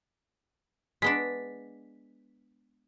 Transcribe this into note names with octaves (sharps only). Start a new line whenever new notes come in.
G#3 B3 D4 B6